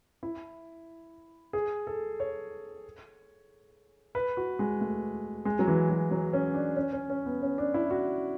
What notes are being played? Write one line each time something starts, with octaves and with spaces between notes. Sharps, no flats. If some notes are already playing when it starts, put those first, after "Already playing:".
E4
G#4
A4
C#5
B4
F#4
G#3
A3
G#3
F#3
E3
F#3
F#3
C#4
D4
C#4
C#4
C#4
B3
C#4
D4
E4
F#4